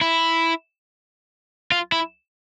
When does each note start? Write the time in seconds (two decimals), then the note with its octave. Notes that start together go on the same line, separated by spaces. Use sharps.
0.01 E4
1.72 F4
1.92 E4